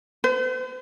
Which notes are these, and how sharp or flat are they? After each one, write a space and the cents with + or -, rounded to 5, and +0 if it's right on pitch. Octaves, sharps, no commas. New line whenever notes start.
C5 -45